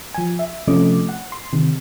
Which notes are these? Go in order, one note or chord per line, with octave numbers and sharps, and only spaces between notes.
F3 G#5
E5
C3 F3 A3 C#4 D#5 D6
F#5
C6
C3 D#3